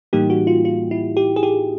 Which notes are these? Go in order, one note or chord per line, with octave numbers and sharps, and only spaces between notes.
A2 E3 G3 A#3 D#4 G4
F#4
F4
F4
E4
G4
G#4
G4